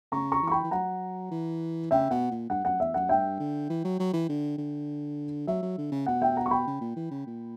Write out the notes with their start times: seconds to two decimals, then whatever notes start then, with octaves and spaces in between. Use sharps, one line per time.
0.12 C#3 A#5 C#6
0.32 A#5 C#6
0.42 E3
0.47 C#6
0.51 G5 B5
0.63 E3
0.71 F#3 F#5 A#5
1.31 E3
1.91 C#3 E5 G5
2.11 B2 F#5
2.31 A#2
2.50 G2 F#5
2.65 F#2 F#5
2.80 E2 E5
2.94 F#2 F#5
3.09 G2 E5 G5
3.39 D3
3.69 E3
3.84 F#3
3.99 F#3
4.13 E3
4.29 D3
4.58 D3
5.47 F#3 E5
5.62 F#3
5.78 D3
5.92 C#3
6.06 B2 F#5
6.22 E5 G5
6.37 F#5 A#5
6.46 C#6
6.51 G5 B5
6.67 C#3
6.81 A#2
6.96 E3
7.11 C#3
7.27 A#2